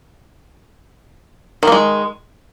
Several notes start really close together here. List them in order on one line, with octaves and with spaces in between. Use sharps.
D#3 A#3 G#3